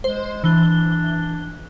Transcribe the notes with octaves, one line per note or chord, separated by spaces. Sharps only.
G#3 C5
E3 D4 G7